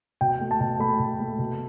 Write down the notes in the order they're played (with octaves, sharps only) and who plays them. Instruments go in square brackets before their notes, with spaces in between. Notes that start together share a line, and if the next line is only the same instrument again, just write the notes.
[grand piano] B2 G5
A3
A5
B2
A3 B5
B2
A3
B2